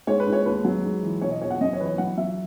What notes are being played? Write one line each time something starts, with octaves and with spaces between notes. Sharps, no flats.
G#2 C#5
B4
G#2
C#5
D#2 B4
F#3
G#2
E3
B2 C#5
D#5
E2 C#5
F#5
F#2 D#5
C#5
E3 B4
C#5
F#3 F#5
F#3 E5